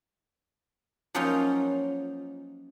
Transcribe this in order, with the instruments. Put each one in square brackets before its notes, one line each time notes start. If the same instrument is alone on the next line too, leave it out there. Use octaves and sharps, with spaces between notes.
[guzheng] F3 F#3 A#3 C#4 D#4 F4